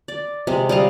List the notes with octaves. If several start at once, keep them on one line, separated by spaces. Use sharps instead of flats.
D5
C3 G#3
G3 D#5 F5